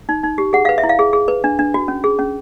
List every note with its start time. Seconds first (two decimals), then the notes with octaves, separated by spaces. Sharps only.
0.09 D#4
0.23 D#4
0.38 G4
0.53 G#4 F#5
0.65 B4 F5
0.78 E5
0.83 E4
0.89 F5
0.99 G#4
1.13 G#4
1.28 B4
1.44 D4
1.59 D4
1.74 F#4
1.88 C#4
2.04 G#4
2.19 C#4